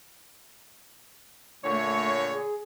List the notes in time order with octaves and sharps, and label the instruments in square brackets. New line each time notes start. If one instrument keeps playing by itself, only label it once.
[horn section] A#2 D3 C#5 [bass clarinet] A3
[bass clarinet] G#4